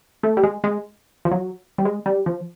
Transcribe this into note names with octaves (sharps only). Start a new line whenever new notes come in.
A3
G3
G#3
G#3
F3
F#3
G3
G#3
G3
F3